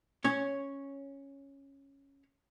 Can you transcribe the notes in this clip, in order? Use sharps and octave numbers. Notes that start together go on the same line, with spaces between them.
C#4 C#5